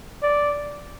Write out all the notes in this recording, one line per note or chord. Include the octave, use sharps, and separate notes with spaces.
D5